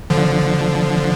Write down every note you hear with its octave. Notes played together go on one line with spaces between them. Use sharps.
D3 F3